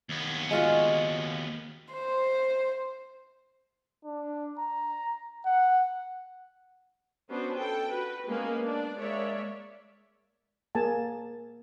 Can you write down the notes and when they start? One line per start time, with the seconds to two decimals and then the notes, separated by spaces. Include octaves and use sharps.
0.09 D#2 B3
0.51 G#3 F4 F#4
1.94 C5
4.04 D4
4.59 A#5
5.45 F#5
7.29 B3 C#4 D4 F#4 C5
7.58 A4 G5
7.90 F#4 B4
8.28 G#3 A#3 B3 C#4 G#4
8.63 D4 D5
8.96 G#3 A#3 C#5 D5 E5
10.75 A#3 G#4 G#5 A5